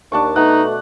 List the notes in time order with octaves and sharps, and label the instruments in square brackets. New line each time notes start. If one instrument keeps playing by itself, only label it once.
[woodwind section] D#2 [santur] D4 A5 C#6
[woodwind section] B2 A3 [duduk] D#4 [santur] F#5